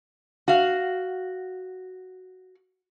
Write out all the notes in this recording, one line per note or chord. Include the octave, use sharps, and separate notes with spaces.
F#4 F5